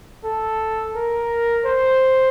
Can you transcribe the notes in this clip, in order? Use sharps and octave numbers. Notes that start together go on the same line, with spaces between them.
A4
A#4
C5